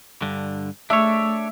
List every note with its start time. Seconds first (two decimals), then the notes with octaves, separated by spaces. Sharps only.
0.22 G2 D3
0.90 A3 D4 C#5 E5